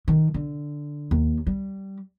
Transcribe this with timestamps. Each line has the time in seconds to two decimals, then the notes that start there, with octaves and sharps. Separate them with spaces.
0.08 D#3
0.34 D3
1.11 D#2
1.47 G3